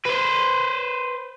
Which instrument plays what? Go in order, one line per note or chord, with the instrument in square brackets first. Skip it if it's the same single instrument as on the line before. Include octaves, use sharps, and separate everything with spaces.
[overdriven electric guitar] B4 C5